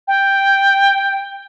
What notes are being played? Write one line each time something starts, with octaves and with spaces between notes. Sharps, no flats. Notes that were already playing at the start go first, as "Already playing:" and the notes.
G5